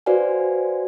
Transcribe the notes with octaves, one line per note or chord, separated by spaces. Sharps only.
F#4 B4 C5 D5 F5 G#5